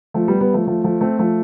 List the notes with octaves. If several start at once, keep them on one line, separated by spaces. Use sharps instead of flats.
F3 A3
G3 B3
G3 B3
F3 A3
F3 A3
F3 A3
A3 C4
F3 A3